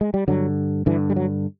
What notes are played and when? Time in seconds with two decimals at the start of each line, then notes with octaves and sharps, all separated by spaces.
0.01 G#3
0.14 G3
0.28 G2 D3 F#3
0.86 G2 D3 E3
1.10 G3
1.16 F#3